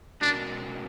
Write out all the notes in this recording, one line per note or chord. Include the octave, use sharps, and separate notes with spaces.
B2 G#3 C#4 D4 F#4 A#4